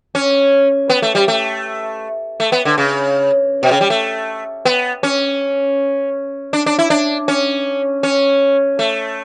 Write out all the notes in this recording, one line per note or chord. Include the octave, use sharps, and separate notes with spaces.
C#4
B3
A3
G3
A3
A3
B3
D3
C#3
B2
C#3
G3
A3
B3
C#4
D4
D4
E4
D4
C#4
C#4
A3